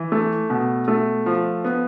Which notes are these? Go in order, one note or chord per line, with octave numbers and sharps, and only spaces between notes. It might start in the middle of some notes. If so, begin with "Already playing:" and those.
Already playing: E3
A3
B2
A3
F3
B3